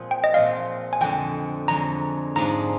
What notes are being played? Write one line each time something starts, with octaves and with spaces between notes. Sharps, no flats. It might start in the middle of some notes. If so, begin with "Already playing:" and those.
Already playing: A#2 F3 G#3 C4
G5
D#5
A#2 F3 G#3 C4 F5
G#5
F2 D3 G#3 G5
F2 D3 G#3 A#5
G#2 F3 G#3 D4 A#5